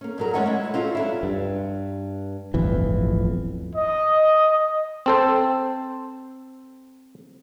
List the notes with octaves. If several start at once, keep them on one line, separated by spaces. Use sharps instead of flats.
A#3 C#4
G2 F#3 A#4
G#3 A3 C#4 D#5 F#5
G#3 E4
C4 C#4 F4 F#4 A4
F#3 D4 E4
G2
D1 G1 F2 E3
D#5
C4 A4 C5